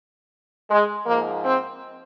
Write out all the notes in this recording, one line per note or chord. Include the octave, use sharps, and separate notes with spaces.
G#3
G#2 F3 A#3
C4